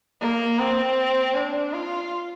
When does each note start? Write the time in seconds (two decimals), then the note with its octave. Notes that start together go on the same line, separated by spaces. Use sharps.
0.21 A#3
0.60 C4
1.35 D4
1.73 F4